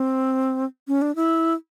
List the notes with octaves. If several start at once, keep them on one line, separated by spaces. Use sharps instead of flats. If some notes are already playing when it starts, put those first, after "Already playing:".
Already playing: C4
C#4
D4
E4